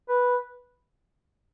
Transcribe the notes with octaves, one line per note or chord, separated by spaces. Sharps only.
B4